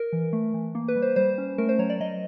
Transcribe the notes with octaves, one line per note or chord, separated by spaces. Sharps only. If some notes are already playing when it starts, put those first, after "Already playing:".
Already playing: A#4
E3
A3
E3
A#3
B4
G3
C5
G3 C5
C#4
A3 A#4
C5
F#3 C#5
D5
F#3 D#5